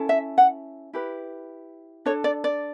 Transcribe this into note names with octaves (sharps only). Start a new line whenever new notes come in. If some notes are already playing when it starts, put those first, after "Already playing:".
Already playing: C#4 E4 A4
E5
F#5
E4 G4 B4
D4 A4 C#5
D5
D5